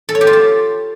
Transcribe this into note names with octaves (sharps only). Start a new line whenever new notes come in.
A4
C#5
G4
F4
A5